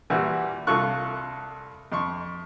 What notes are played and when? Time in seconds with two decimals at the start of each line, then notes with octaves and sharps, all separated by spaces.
0.10 A#2 E3 G3 F#4
0.67 C2 F4 A4 C#6 F#6
1.92 F2 C6 C#6